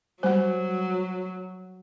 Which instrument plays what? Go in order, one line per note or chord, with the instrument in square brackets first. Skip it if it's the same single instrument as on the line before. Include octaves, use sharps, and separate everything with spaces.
[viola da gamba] F#3 [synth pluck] G3 G#5 [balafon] C5 F#5